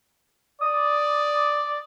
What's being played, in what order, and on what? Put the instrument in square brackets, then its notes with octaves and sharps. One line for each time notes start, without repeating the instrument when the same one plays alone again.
[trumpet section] D5 [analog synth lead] D#6